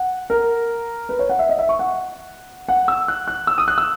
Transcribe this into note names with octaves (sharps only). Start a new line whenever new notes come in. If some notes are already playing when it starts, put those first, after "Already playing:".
Already playing: F#5
A#4
B4
C#5
F#5
E5
D#5
E5
C#6
F#5
F#5
E6
F#6
F#6
E6
D#6
F#6
E6